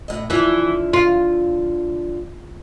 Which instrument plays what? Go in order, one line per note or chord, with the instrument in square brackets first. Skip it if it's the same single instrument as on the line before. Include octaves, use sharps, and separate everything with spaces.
[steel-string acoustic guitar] A2 D#5
[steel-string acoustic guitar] D3 F3 [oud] E3
[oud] F4